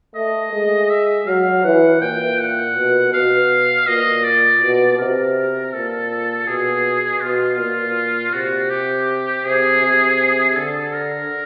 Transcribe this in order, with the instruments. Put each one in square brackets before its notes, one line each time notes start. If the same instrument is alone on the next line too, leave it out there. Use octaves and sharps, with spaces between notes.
[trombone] A3 [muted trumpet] D#5
[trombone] G#3
[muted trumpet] E5
[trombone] F#3 [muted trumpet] F5
[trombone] E3 [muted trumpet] F#5
[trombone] A#2 [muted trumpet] G5
[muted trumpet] F#5
[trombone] B2
[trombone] B2 [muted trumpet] F5
[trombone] A#2 [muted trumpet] D#5
[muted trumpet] D5
[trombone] B2
[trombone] C3 [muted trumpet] A#4
[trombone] A#2 [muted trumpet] A4
[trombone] B2 [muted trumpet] G#4
[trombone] B2 [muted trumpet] F4
[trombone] A#2
[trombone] C3 [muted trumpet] F#4
[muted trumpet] G4
[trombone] C3 [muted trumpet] G#4
[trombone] C3
[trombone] D3 [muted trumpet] A4
[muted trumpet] A#4